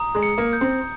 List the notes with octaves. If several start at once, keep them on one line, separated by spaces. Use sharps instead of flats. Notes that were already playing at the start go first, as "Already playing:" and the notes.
Already playing: A#5 D#6
G#3
C#7
A#3
G6
C4